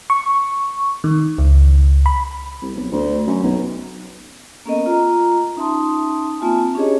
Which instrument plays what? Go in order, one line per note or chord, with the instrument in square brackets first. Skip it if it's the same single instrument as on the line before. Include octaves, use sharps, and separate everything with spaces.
[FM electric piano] C#6
D#3
C#2
B5
[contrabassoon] C2
B1
D2
F#2
B1
[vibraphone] A#3 B3 C#4 A4 A#4 D#5
F4 A#5
C#4 D#4 E5 A5 C6 D#6
A#3 C4 F4 E5 G#5 A5
C#4 D4 G4 G#4 C#5 D#5